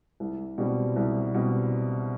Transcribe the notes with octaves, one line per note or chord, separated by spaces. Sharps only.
C2
B2 G3 C4
C2
B2 G3 C4